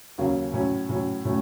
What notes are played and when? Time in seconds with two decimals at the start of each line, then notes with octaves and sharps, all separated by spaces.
0.18 D#2 C#3 F#3 C#4
0.53 A2 F#3 C#4
0.89 A2 F#3 C#4
1.25 A2 F#3 A3 C#4